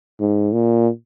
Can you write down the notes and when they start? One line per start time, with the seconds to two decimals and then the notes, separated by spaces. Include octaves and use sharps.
0.20 G#2
0.54 A#2